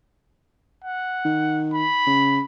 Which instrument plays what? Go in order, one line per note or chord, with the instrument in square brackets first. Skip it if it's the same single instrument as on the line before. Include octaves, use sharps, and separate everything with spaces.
[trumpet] F#5
[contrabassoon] D#3
[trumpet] B5
[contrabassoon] C#3